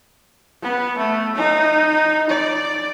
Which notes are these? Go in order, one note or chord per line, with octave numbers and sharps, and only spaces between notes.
B3
A3
D#4
D5